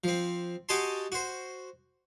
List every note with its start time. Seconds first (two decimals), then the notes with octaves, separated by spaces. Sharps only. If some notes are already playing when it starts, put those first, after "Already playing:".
0.04 F3 C4
0.69 F#4 G4 D#5 G#5 A5 C6
1.12 F#4 C5